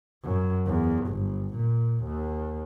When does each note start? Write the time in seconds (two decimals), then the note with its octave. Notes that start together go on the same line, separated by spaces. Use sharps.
0.24 F#2
0.67 E2
1.07 G1
1.55 A#2
2.05 D#2